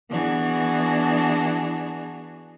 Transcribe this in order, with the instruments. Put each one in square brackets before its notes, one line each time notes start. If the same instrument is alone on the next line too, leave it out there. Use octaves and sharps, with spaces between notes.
[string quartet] E3 B3 D4 F#4 G#4